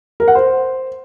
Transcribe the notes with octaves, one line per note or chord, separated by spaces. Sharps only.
A#4
F#5
C5